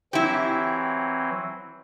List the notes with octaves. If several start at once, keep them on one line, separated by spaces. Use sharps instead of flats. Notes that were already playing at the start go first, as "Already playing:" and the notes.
E3 F#3 C4 E4 G4